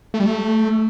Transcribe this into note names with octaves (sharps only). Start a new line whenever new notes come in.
A3
G3
A3